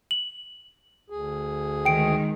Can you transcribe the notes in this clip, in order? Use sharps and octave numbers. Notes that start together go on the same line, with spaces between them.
F#7
D2 G#4
D#3 G#3 G5 D7